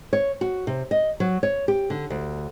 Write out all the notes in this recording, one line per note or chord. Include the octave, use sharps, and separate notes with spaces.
C#5
F#4
C3
D#5
F#3
C#5
G4
D3
D2